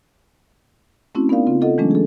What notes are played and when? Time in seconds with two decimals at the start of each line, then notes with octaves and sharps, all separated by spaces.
1.15 A3 C4 C#4 E4 F#4
1.29 B3 D#4 A#4 D5 F5
1.47 C#3 C4 F4
1.61 F4 A4 D#5 F#5
1.78 E3 F#3 G#3 A3 C#4 D4
1.91 G#4 A4